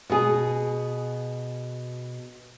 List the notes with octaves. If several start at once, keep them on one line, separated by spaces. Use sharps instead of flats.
B2 G#4